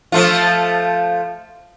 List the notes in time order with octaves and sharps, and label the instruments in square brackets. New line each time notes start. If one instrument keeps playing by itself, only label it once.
[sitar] F3 A3 F4